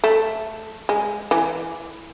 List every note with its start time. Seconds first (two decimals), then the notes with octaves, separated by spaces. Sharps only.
0.04 A3
0.89 G#3
1.31 E3